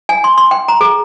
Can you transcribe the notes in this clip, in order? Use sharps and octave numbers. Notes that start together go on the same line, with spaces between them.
G#5
C6
C6
G5
A#5
G#4